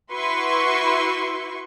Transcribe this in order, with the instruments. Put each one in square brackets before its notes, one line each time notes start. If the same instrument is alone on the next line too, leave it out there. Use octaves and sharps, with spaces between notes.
[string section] E4 F#4 B4 C6 C#6